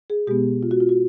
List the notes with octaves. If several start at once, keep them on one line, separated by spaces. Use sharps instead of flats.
G#4
B2 G#3 B3 G4
F4
F#4
F4
F#4